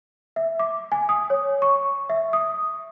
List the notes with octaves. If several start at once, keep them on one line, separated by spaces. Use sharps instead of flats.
E5
D6
G#5
D#6
C#5
C#6
E5
D#6